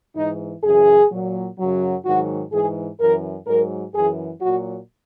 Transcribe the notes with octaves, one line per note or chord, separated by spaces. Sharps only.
G#2 E3 D#4
F#2 C#3 E3 G#4
A#2 F#3
F#2 C#3 F#3
G#2 D#3 F#3 F#4
G#2 E3 G#4
F#2 E3 A#4
G#2 F#3 A#4
F#2 E3 G#4
A#2 F#3 F#4